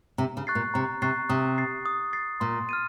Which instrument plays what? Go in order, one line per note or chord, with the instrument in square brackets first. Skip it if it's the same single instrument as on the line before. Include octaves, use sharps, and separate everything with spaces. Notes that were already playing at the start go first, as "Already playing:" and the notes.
[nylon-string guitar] C3 [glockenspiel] A#5
[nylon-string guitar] C#3
[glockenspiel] C#6 F#6 A6 C7
[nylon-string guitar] A#2
[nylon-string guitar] C3 [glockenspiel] A#5
[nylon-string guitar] C3 [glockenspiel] C#6 F#6 A6 C7
[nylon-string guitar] C3 [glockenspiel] D#6
[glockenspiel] A6 C7
D#6
A6 C7
[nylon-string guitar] A#2 [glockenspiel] C6
[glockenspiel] F6 A6 D#7